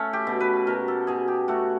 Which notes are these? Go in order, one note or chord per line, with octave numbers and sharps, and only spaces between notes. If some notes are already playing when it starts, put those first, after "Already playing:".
Already playing: A3 C#4
G4
B2
B4
B2 A#4
A4
B2 G#4
G4
A3 F#4